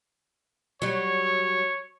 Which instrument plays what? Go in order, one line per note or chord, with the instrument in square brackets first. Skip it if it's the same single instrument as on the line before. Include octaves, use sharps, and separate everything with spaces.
[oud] F#3 G3 [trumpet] C#5